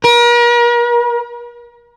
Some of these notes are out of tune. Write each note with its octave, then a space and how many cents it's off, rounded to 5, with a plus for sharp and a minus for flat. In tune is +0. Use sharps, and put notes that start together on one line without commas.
A#4 +40